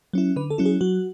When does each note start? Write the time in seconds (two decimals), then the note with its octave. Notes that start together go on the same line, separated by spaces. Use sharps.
0.13 F#3 C#4 E4
0.36 D3 B4
0.50 A4
0.58 F#3 C#4 E4
0.65 G#4
0.81 F#3 F#4